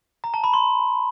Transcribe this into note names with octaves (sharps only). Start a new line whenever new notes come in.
A#5
A5
B5
C6